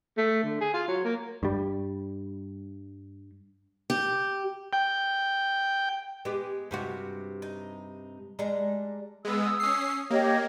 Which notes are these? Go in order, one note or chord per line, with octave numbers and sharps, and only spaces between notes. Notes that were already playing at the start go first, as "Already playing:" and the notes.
A3
D3
G#4
F4
F#3
A#3
G2 G3
G4
G5
G#3 B3 G4
G2 C3 F#4
D#4
G3 G#3 D4 A#5
G#3 B3 D#6 E6
C#4 C7
A#3 G4 C#5 D#5